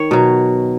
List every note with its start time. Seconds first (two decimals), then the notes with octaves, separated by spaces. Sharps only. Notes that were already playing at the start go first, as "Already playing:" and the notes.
Already playing: D#3 C#5
0.11 B2 F#3